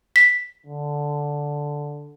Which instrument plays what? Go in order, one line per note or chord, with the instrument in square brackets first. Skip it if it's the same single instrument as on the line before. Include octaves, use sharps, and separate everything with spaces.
[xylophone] B6
[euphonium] D3